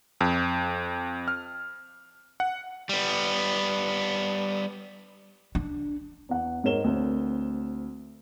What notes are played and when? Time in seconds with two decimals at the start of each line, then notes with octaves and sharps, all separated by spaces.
0.21 F2
1.28 F6
2.40 F#5
2.89 G3 B3
5.55 D4
6.29 E2 F#5
6.64 G#2 G#3 A#4 C#5 E7 G7
6.84 D2 C4